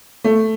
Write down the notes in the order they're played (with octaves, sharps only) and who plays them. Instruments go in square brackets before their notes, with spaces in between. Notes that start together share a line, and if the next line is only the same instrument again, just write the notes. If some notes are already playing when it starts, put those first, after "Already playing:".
[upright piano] A3